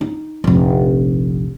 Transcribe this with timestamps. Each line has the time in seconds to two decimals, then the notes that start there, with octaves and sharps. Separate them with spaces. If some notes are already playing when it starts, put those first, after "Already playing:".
0.01 D#4
0.44 F1 A#1